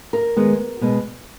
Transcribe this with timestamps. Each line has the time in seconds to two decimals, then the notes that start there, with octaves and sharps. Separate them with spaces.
0.13 A#4
0.37 D#3 G#3 B3
0.81 B2 G#3 B3